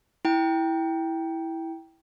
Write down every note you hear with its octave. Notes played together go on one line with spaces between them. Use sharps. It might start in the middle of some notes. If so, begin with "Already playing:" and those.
E4 G5